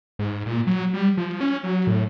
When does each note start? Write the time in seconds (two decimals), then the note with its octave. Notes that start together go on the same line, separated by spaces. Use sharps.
0.19 G#2
0.46 A#2
0.67 F#3
0.94 G3
1.17 F3
1.41 C#4
1.64 F#3
1.87 A2